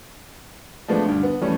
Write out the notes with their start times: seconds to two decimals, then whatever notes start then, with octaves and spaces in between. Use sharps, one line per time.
0.88 F3 G#3 A3 B3 D4
1.06 D2 G2
1.20 D3 B3
1.41 F2 E3 G3 A3 C#4